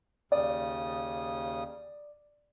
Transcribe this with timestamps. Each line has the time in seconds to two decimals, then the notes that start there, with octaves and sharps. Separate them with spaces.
0.32 D#2 C#3 D5 D#6